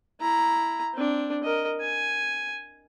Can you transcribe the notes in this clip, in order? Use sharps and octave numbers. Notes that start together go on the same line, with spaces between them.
E4 A#5
C4 D4
A#4 D#5
G#5